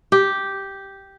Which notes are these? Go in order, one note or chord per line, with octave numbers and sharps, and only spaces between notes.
G4